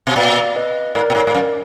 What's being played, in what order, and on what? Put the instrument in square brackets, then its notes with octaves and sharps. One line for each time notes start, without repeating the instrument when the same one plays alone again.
[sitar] B2
[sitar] A#2 [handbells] D5 F5
[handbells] B4 D#5
[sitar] G#2 [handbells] A#4 D5
[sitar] A#2
G#2
G#2
F#2